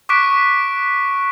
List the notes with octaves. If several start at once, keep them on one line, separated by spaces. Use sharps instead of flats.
C#6 D6 F#6 B6 D7